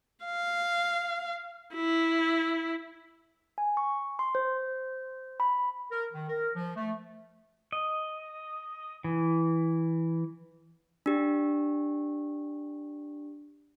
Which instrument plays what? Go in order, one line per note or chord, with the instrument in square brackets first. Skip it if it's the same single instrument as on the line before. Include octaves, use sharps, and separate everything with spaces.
[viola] F5
E4
[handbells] G#5
C#6
C6
C5
B5
[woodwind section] A#4
D#3
A#4
F3
A3
[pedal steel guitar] D#5
E3
[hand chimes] D4 G4